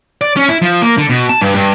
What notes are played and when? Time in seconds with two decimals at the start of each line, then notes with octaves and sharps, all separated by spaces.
0.21 D5
0.36 C#4
0.48 E4
0.62 F3
0.82 A#3
0.97 D3
1.10 B2
1.29 A5
1.41 G2
1.55 G2